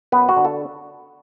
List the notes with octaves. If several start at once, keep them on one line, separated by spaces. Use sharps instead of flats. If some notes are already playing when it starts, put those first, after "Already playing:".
F#2 B3 B4
F#4
D3
A4